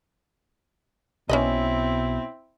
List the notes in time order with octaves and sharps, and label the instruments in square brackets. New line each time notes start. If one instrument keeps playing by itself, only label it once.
[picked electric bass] B1 [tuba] B2 [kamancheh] C4 E4 [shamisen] C#4 B4 D#5